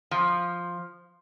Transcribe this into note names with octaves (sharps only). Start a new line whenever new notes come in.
F3